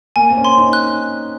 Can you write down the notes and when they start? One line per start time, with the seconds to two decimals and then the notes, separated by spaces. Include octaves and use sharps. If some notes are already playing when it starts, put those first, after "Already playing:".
0.16 A#3 G#5
0.30 C4
0.37 C#4
0.45 C6
0.58 D#4
0.73 F#6